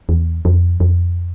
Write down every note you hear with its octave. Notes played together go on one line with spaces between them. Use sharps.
E2
F2
F2